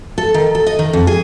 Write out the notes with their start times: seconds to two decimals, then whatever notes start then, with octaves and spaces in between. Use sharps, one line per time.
0.18 A4
0.34 D#3
0.55 A4
0.66 D#5
0.79 D#3
0.93 F2
1.07 G#4